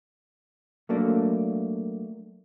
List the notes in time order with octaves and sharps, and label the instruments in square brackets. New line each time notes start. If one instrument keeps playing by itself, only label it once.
[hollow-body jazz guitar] F#3 A3 A#3 D4